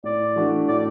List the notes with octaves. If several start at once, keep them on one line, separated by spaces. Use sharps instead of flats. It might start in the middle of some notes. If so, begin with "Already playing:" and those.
A2 D5
E3 A3 D4 F#4
A2 D5